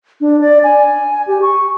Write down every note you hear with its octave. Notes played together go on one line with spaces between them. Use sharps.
D4
D5
G#5
G4
C#6